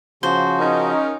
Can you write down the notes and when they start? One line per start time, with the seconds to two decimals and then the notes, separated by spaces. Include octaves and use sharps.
0.23 C#3 F3 F#4 C5
0.59 C#4 D#4 A#4